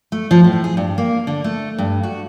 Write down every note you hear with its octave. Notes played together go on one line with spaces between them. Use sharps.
A3
F3
A2
G#4
G2
A#3
D3
A3
G2
F#4